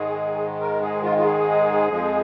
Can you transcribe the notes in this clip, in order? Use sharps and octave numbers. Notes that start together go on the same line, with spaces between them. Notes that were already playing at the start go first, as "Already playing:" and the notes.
Already playing: G#2 D#3 G#3 G#4
A#4
G#4
F4
F4
G#4
F2 F3 G#3